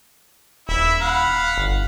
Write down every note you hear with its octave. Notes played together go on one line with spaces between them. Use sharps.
D#1 E4 E5
F5 F#5 B5
G1